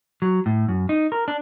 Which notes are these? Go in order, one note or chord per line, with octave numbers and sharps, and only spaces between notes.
F#3
A2
F#2
D#4
A#4
D4